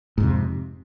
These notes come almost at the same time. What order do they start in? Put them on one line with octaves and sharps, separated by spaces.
G#2 F2 C3